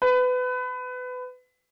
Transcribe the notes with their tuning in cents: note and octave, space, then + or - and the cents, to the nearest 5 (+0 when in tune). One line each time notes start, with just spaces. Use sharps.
B4 +25